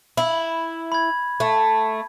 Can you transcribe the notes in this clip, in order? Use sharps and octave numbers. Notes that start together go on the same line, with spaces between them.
E4 B5
B5 G#6
A3